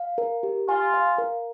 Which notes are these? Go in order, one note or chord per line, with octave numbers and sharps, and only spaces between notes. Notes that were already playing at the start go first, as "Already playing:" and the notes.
Already playing: F5
A#4
G4
F4 G#5
F5
A#4